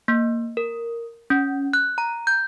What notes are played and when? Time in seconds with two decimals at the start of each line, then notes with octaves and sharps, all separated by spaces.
0.08 A#3
0.57 A#4
1.30 C#4
1.73 F#6
1.98 A#5
2.27 G6